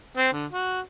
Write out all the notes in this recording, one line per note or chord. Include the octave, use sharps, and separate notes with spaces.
C4
D3
F#4